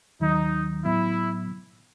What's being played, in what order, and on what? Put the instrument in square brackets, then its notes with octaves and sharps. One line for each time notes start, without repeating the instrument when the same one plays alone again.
[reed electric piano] D#2 D#3 F#3 [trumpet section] D#4
[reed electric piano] A2 F#3 B3 [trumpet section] E4